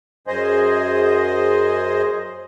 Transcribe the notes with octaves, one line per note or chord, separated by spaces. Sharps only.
F#2 G#4 C5 D#5